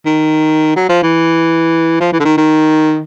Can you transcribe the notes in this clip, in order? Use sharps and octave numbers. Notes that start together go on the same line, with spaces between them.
D#3
F#3
F3
E3
F3
E3
D3
D#3
D#3